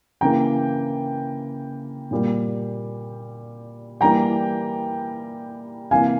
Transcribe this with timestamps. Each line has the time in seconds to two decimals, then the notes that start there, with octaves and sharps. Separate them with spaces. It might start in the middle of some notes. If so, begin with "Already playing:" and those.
0.21 C#3 E3 A#3 G5 A#5
2.11 A#2 G3 A#3
4.01 E3 G3 A#3 G5 A#5
5.91 C3 E3 A#3 F5 G#5